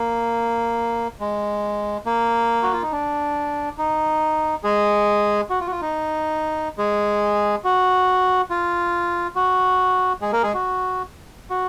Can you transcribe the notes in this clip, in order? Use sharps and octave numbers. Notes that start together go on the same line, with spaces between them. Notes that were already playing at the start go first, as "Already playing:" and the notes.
Already playing: A#3
G#3
A#3
F#4
F4
D#4
D4
D#4
G#3 G#4
F#4
F4
F#4
F4
D#4
G#3 G#4
F#4
F4
F#4
G#3 G#4
A#3 A#4
G#3 G#4
F#4
F#4